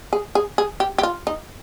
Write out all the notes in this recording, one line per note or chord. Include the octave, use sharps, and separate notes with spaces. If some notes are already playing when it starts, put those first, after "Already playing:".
G#4
G#4
G#4
G4
G4
F4
D#4